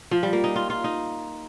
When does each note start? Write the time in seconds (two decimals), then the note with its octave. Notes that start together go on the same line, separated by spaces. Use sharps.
0.11 F3
0.23 G3
0.33 A#3
0.44 D#4
0.56 F4
0.70 F4
0.84 D#4